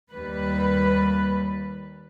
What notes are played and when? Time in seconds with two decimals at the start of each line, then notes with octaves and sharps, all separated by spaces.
0.11 D#2 G3 B4